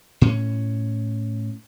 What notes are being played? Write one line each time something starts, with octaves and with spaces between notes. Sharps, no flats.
A2 C#4